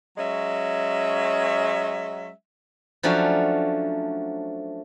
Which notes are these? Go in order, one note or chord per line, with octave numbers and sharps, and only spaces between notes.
F#3 G#3 C#4 E5
F3 F#3 A3 C#4 D4 F#4